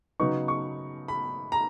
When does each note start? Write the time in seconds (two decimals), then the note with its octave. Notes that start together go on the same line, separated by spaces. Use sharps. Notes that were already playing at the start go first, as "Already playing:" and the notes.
0.20 C#3 F#3 B3 D#4 C#6
0.48 C#6
1.08 B5
1.52 A#5